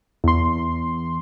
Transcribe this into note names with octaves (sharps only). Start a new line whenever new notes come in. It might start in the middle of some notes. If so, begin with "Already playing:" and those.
E2 C6